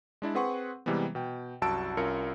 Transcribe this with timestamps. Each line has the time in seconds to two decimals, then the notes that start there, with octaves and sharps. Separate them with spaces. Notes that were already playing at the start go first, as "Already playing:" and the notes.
0.22 G#3 D4 E4 D5
0.35 C4 G#4 B4 F#5 C6 C#6
0.86 C3 E3 G3 G#3 B3
1.15 B2 G5
1.62 C2 F#2 F#4 A5 E6 D7
1.97 C2 C#4 F4 A#4 C#7